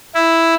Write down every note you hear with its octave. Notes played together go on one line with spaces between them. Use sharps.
E4